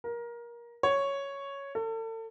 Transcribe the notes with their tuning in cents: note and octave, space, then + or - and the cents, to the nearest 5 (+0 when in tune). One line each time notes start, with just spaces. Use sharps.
A#4 +20
C#5 +0
A4 +35